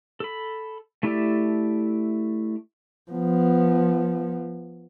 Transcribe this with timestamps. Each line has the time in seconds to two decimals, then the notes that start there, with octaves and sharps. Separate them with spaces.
0.20 A4 B5
1.03 A3 E4 G4 D5 E5
3.11 F3 B3